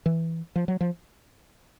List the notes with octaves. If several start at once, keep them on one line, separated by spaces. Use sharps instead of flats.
E3
F3
F#3
F3